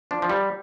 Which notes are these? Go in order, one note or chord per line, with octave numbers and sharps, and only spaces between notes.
F3 D4
F3
G3